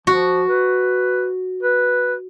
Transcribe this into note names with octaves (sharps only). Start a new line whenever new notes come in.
F3 F#4
B4
B4